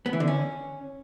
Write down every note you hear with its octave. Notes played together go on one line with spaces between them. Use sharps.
B3
E3
D3
C#4